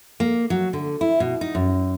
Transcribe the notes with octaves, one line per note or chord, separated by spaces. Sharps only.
A#3
F#3
D3
E4
B2
D#4
F#2